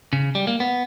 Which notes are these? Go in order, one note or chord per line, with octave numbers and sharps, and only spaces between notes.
C#3
G3
A#3
B3